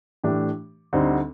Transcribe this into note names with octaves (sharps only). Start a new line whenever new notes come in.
A2 E3 A3 D4 G4
D2 D3 G3 C4 D#4